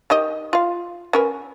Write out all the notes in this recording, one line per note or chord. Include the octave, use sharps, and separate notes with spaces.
D#3 G4 D#5
F4 F5
C#4 A#4 B4